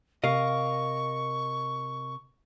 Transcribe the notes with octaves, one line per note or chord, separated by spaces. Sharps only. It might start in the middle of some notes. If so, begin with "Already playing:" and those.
C3 A#4 D#5 F5 C#6